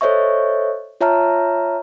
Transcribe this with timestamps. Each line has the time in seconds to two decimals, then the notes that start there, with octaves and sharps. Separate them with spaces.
0.01 A4 C5 C#5 D#5 E5 C#6
1.01 F4 C#5 E5 A5 A#5 F6